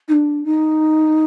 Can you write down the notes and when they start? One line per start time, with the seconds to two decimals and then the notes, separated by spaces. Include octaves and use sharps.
0.08 D#4
0.12 D4
0.44 D#4